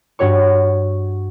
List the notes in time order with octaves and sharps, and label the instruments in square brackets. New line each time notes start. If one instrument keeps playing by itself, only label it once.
[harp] G2 F#4 C#5 C#6